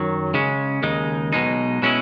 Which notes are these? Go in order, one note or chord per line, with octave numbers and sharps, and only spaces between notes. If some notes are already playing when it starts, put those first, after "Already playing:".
Already playing: F#2 D#3 F#3
C#3 G#3 C#4
D#2 C#3 G#3 D#4
B1 B2 G#3 D#4
B2 G#3 C#4 E4